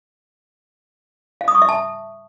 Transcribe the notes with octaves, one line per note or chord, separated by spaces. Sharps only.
F5
D#6
C#6
E5
A5